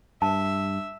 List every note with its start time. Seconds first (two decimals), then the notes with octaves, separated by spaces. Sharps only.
0.22 G2 E5 A5